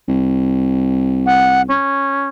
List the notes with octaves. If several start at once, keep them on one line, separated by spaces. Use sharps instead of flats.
C2
F#5
C#4